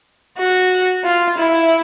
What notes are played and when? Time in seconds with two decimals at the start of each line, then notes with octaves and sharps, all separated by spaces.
0.38 F#4
1.05 F4
1.38 E4